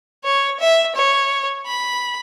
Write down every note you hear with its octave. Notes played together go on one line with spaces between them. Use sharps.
C#5
E5
C#5
B5